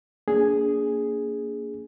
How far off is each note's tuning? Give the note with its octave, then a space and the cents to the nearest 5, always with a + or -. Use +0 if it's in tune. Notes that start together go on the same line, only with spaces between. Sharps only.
A#3 +0 D4 -30 G#4 +0